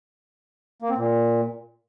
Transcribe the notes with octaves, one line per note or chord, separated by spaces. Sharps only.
A#3
C4
A#2